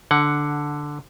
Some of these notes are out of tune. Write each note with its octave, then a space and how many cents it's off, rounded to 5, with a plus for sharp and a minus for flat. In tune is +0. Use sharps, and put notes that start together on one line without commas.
D3 +0 F#5 +0